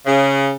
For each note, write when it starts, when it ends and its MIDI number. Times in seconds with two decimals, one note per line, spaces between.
0.06 0.52 49